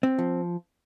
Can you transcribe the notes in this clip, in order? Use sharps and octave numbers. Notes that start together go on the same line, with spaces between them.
C4
F3